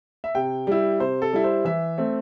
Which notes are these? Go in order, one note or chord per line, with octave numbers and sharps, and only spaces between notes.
E5
C3 G5
G3 E4
C3 C5
A4
G3 E4
C5
E3 E5
A3 C4